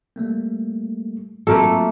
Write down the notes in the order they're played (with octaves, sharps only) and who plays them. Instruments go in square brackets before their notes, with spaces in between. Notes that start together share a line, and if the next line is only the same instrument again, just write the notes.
[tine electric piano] G3 A3 A#3
[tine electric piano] F#3 C4 F4 [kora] A3 A#3 A4